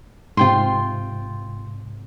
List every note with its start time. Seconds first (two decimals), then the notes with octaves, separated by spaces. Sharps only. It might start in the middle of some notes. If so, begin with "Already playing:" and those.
0.37 G#2 C3 F4 G5 C6